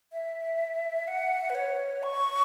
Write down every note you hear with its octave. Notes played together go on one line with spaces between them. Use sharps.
E5
F#5
B4
C#5
C#6